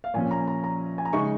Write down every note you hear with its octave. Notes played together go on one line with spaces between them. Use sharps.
F5
A#2 F3 C#4 G#5
A#5
A#5
A#5
G#5
A#5
C#3 G#3 D#4 C#6